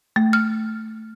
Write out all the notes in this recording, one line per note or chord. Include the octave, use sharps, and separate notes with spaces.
A3
F6